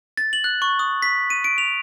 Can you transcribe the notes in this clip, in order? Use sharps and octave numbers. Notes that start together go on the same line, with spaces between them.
A6
F#7
F#6
C#6
D#6
B6
D#7
D7
F7